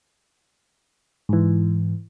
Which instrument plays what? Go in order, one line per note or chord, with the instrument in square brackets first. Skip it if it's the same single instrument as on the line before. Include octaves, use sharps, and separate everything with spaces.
[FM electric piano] G#2 E3